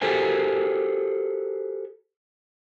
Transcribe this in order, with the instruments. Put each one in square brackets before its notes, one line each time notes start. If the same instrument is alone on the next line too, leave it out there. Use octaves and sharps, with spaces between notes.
[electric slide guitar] F#4 G4 A4 A#4 C5 G#5